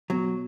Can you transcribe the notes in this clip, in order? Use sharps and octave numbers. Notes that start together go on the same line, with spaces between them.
B2 F#3